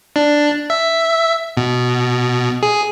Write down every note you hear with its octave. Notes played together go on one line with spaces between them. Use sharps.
D4
E5
B2
G#4